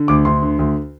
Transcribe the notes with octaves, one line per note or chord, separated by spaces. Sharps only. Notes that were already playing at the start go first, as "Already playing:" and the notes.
Already playing: D3
D2 D6
D2 C6
D3
D2